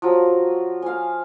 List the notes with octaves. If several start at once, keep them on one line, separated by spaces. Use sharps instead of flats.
F3 F#3 F#4
F5 G#5